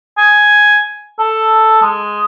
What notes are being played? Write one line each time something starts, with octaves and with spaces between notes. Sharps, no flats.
G#5
A4
G#3